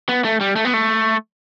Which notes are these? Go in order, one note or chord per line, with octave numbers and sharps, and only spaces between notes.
B3
A3
G3
A3
B3
A3